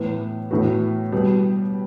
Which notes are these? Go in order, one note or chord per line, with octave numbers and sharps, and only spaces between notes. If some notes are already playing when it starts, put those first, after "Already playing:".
Already playing: A2 E3 B3
A2 E3 B3 F#4 B4
B2 G3 B3